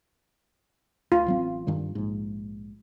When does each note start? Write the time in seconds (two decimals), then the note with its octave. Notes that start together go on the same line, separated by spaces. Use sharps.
1.12 D2 F4
1.26 A1 F#3 C4
1.67 G2 D#3 G3
1.95 A#1 G#2